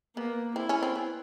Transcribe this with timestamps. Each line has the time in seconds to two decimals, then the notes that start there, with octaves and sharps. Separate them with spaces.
0.16 A#3 B3
0.56 C4 E4
0.69 C#4
0.83 C4
0.96 B3